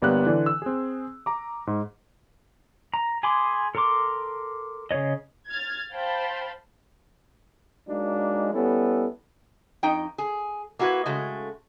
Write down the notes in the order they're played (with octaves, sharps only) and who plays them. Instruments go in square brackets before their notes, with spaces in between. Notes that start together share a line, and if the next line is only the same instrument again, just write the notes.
[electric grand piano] G1 G3 A#3 B3 G5 F#6
D3 E3 D5
E6
C4 G#4
A#5 D6
G#2
[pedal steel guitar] A#5
G#4 G#5 B5 C6 D6
A4 A#4 A#5 C6 D6
C#3 G#4 C#5 D#5
[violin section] F6 G#6 A6
C5 F5 G5 A5 B5
[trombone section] F#3 G#3 A#3 D4 D#4
G3 B3 C#4 E4 A4
[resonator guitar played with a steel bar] F2 D#4 G5
G#4
A#3 E4 F#4 A#4 B4
C#3 G#3 A3 F#4